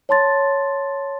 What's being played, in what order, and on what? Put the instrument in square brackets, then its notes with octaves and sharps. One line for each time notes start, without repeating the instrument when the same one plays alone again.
[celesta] C#5 A5 C6 A6